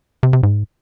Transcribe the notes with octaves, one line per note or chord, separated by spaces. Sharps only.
C3
C3
G#2